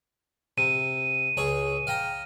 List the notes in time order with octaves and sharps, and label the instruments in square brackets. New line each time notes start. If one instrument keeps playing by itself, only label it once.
[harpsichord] C3 [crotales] D#7
[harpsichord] C#2 G#4 C#5
F5 G5 A#5